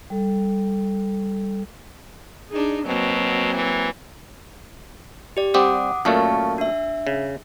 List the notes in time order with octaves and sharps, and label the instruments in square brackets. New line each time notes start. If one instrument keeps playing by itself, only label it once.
[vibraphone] G3 A4
[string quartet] D4 D#4 G#4
[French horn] B2 [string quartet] F#3 A#3 C4
[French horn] E3
[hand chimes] G4 D5
[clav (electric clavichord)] G3 C4 G4 [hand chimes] F#5 D6 D#6
[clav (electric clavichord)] F#2 A#2 A3 [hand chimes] F5 A5 C#6
[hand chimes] D4 E5
[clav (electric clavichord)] C#3